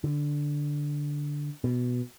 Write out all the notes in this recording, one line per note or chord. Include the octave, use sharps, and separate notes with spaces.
D3
B2